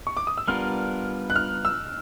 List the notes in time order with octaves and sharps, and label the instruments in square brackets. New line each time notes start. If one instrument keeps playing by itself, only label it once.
[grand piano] C#6
D6
D#6
E6
[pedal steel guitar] G3 B3 D4 F4 A#4 [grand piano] F6
[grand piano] F#6
F6
E6